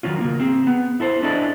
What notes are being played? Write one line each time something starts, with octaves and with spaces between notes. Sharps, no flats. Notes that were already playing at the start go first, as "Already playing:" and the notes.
D#3 F#3 C#4 F4
C#3 A#3
C4 G#4
B3
E4 A4 C5
C#4 D4 E4 G#4 A4 D#5